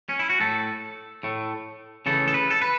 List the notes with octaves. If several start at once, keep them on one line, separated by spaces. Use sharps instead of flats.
C#4
E4
F#4
A2 A3 A4
A2 A3
C#3 E3 A3 A4
A4
B4
A4
B4